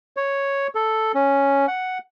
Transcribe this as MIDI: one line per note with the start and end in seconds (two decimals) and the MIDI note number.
0.17 0.67 73
0.75 1.12 69
1.14 1.66 61
1.68 1.98 78